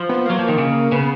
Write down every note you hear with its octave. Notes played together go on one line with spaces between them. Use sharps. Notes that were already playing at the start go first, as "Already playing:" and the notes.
Already playing: F3
B3
F#3 A#3
F3
D#3
C#3
C#3 B3